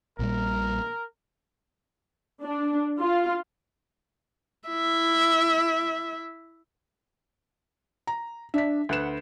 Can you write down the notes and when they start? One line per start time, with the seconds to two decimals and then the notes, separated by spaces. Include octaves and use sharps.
0.19 A#1 A#2 G3 A#4
2.43 D4
2.99 F4
4.69 E4 E5
8.07 A#5
8.54 D4 E5 B6
8.89 D2 B4 F#5 E7